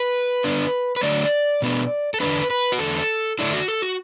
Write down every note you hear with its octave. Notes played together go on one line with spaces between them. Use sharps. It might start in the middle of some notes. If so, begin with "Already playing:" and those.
Already playing: B4
D3 B3 D4
B4
D3 F#3 A3 D4 D5
B2 B3 D4
A4
E2 D3 B3 D4 B4
B4
F#4
E2 D3 A3 A4
D3 A3 D4 E4
F#4
A4
F#4